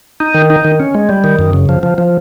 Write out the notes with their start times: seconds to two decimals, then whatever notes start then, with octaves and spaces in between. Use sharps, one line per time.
0.20 D#4
0.34 D#3
0.50 D#4
0.64 D#3
0.80 C#4
0.95 G#3
1.09 G3
1.24 D#3
1.39 F#2
1.53 C#3
1.69 F3
1.83 F3
1.98 F3